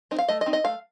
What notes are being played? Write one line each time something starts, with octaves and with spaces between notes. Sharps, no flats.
C4 D#4
F5
A3 D#5
D#5
C4 D#4
D#5
A3 F5